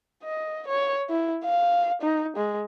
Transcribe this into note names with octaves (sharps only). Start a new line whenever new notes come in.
D#5
C#5
E4
F5
D#4
G#3